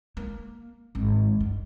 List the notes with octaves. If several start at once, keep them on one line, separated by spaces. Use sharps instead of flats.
A#3
G#1
G2